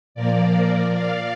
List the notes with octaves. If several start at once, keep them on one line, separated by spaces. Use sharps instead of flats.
A#2 F3 A#3 A#4 D5
D5 F5